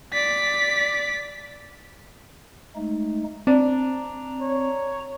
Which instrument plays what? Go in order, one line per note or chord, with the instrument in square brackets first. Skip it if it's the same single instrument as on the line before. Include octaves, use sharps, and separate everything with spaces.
[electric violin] D5 B6
[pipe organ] G#3 A3 D#4
[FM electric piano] C4 [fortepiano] D4 [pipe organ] A#5
[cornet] C#5